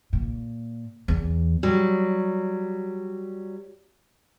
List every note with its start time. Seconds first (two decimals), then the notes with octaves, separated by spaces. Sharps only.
0.13 A#2
1.08 E2
1.63 F#3 G3